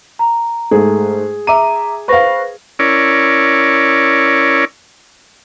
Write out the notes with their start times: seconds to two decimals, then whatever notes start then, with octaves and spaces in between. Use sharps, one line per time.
0.19 A#5
0.71 G#2 A3 G#4
1.47 E5 A#5 D6 D#7
2.08 B4 C5 F5 C#6 A#6
2.79 C#4 E4 A#4 C#5 D5